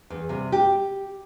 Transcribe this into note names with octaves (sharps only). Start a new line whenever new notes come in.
E2
C3 G3
G4